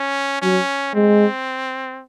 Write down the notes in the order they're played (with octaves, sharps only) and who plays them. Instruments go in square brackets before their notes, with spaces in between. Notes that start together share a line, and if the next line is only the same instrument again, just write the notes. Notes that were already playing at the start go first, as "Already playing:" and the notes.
Already playing: [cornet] C#4
[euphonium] F#3 [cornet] C#4
[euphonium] G#3 [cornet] C4